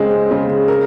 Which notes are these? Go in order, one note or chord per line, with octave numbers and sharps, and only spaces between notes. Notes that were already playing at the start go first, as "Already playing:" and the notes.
Already playing: C#3 G#3 C4
C#3
A#4